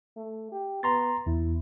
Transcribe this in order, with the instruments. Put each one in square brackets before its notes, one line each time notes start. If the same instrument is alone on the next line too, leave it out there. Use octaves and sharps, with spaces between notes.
[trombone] A3
G4
[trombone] B3 [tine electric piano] A#5 C6 A6
[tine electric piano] E2 [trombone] E4